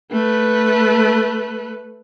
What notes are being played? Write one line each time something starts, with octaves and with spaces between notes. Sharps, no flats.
A3 B4